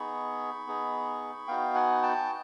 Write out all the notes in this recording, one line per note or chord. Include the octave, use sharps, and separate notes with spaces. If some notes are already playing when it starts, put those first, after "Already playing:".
Already playing: B3 D#4 G#4 B5 C#6
B3 D#4 G#4
B3 D#4 F#4 F5 G5
F#5 G#5
G5 A5